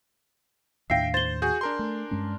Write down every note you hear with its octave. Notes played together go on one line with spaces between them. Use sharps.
D#2 A2 D4 E5 F5 G5 A#6 C7
C5 A6 G7
F#4 G#4 G#5 G6
D4 A#4 C6
A3
G2 G#3 C#4